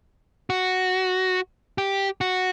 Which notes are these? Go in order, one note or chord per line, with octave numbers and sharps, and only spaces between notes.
F#4
G4
F#4